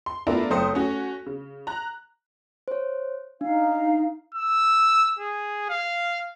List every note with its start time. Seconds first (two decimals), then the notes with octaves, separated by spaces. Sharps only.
0.06 C6
0.27 A3 B3 D4 E4 F4 A#4
0.50 F#1 A3 C4 C5 D#6 C#7
0.74 A3 C#4 F#4
1.26 C#3
1.67 A#5 F#6
2.68 C5 C#5
3.41 D4 D#4 F5
4.34 E6
5.19 G#4
5.69 F5